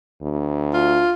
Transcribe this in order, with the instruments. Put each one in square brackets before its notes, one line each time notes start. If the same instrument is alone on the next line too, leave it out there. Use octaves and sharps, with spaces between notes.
[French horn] D2
[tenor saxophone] F4